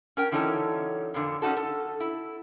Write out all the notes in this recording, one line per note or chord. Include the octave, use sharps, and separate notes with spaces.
C#4 A#4 G5
D3 E3 F#3 C#4 D#4 A4
F2 A#2 D3
C#4 D#4 F#4 A4
A4
E4